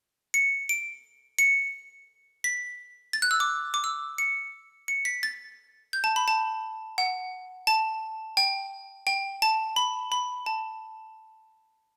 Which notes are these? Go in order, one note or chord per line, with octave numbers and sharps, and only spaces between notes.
C#7
D7
C#7
B6
A6
F#6
E6
D6
D6
E6
C#7
C#7
B6
A6
G6
A5
B5
A5
F#5
A5
G5
G5
A5
B5
B5
A5